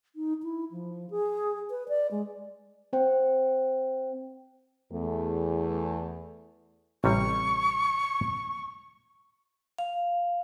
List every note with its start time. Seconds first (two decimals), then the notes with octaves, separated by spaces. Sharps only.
0.16 D#4
0.43 E4
0.72 F3
1.10 G#4
1.70 B4
1.88 D5
2.11 G#3
2.93 C4 C5 G5
4.93 E2 A3
7.04 A1 C3 G3 C#6
9.78 F5